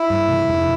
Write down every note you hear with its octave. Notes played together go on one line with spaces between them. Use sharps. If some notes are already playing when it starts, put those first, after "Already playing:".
Already playing: E4
G2
C3
F2